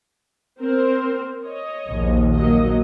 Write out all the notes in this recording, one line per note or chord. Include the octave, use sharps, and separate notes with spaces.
C4 A#4 C5
C#5 D#5
A#1 D#2
F#3 A#3 D#5